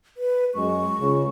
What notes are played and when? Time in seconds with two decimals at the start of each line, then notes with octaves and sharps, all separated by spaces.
0.17 B4
0.55 F#2 G#3 C#6
0.98 C#2 C#3